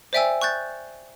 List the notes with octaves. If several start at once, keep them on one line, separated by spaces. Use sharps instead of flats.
C5 D5 E5 G5 G#5 E6
C#6 F#6 G6 A6